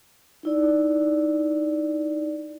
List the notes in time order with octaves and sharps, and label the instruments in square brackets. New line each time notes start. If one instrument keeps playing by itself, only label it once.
[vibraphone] D#4 E4 D5